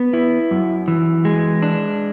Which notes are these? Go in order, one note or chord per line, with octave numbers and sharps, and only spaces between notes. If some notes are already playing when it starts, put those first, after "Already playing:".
Already playing: B3
E4
F#2
E3
G#3
D4